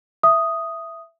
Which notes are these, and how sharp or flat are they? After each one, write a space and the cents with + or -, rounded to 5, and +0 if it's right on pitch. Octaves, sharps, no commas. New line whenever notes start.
E5 +10 D#6 +0